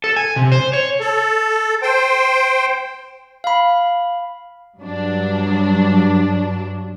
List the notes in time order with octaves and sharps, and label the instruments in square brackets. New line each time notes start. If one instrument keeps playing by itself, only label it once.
[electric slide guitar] A4
G#5
C3
C5
C#5
[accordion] A4
C5 G5
[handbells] F5 B5
[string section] G2 F#3 D4